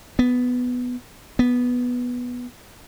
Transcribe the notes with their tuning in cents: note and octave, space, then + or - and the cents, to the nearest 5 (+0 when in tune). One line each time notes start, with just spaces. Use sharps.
B3 +5
B3 -5